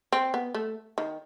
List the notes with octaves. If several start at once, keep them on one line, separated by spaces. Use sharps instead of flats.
C4
B3
A3
D#3